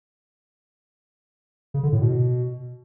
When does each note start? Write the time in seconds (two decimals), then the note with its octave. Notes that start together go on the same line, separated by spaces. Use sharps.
1.74 C#3
1.83 D3
1.92 A2
2.01 B2